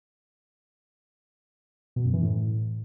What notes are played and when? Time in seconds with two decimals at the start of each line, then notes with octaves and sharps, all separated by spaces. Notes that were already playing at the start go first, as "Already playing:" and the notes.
1.96 B2
2.05 F#2
2.13 E3
2.22 A2